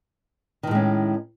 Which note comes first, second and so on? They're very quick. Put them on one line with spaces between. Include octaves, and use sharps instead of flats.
D#3 A2 G#3 C#4